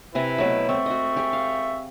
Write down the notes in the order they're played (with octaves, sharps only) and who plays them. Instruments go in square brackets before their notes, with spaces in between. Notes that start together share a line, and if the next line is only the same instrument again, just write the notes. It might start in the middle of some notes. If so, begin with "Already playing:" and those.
[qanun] C3 G#5 A#5 [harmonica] E4 B4
[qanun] B2 F#3 A3
[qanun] C4 [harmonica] E5 C#6
[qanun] F#4 D#5
G4 G#4
F5